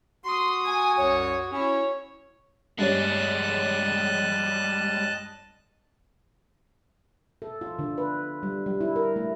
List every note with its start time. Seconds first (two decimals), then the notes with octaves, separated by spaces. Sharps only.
0.24 F#4 C6 D#6
0.66 G#5
0.98 C2 F#2 C#5
1.53 C#4 E4 C#5
2.79 G2 G3 G#3 G4 C#5 D#5 A5 F#6
7.42 A4
7.61 F4
7.79 D3
7.98 B4
8.43 G3
8.66 G3
8.81 E4
8.96 A#4
9.16 A3